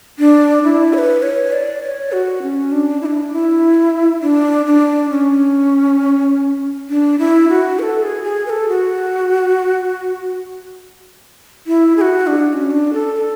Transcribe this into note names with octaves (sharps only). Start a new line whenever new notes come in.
D4
E4
C#5
B4
C#5
D5
C#5
F#4
C#4
D4
E4
D4
E4
D4
D4
C#4
D4
E4
F#4
B4
A4
G#4
G#4
B4
A4
F#4
E4
G#4
F#4
D4
D4
C#4
D4
A4
A4